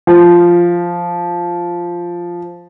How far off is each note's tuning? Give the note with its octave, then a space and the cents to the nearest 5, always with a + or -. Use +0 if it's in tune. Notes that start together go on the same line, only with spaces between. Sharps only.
F3 -5